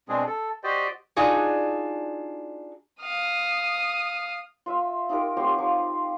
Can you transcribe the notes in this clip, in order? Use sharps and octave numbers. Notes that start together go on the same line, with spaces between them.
B2 G#3 C4 D4 G#4
A4
F#4 G4 C5 D5 D#5 G5
D4 D#4 F4 F#4 G#4
F5 D#6
F4 E5
D#4 F4 G4 A#4
F#3 C4 G4 F5
F3